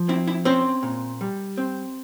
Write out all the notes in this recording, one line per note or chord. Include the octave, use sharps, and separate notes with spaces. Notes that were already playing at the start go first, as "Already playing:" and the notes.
Already playing: F3
C4 E4
E4
C4 C#4 C5
A#2
G3
C4